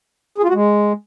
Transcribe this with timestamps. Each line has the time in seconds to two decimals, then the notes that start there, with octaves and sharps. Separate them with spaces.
0.38 G#4
0.43 F4
0.49 F#4
0.54 G#3